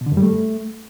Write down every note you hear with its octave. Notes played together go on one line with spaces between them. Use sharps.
B2
D3
F#2
G3
A3